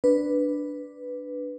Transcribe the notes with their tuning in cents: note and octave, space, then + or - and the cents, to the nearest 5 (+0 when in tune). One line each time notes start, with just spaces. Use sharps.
D4 +0 B4 +0